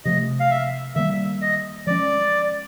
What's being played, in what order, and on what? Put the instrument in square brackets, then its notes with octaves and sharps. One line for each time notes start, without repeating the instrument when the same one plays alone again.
[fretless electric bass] C3 F3 A3 [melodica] D#5
[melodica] F5
E5
[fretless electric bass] D#3 G3 A#3 [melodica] E5
[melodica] D#5
[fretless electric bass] F3 G#3 C#4 [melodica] D5